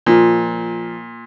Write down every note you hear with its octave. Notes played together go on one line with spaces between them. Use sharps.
A#2 F3